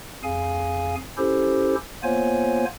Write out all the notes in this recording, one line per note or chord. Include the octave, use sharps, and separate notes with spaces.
F2 G#4 F5 G#5
C#4 E4 G4 A4 C5
A#3 B3 F4 C5 C#5 G#5